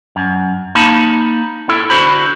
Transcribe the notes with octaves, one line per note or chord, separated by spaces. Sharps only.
F#2
A#3 D#4 A5 B5
E4 A4
D3 F#4 C5 B5